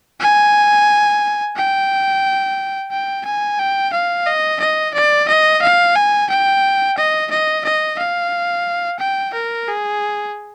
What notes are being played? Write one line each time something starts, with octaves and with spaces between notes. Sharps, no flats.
G#5
G5
G5
G#5
G5
F5
D#5
D#5
D5
D#5
F5
G#5
G5
D#5
D#5
D#5
F5
G5
A#4
G#4